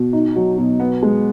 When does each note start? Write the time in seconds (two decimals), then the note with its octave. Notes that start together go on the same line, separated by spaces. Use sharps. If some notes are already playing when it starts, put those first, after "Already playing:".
Already playing: B2
0.13 D#4
0.36 F#3
0.58 B2
0.80 B3
1.02 G#3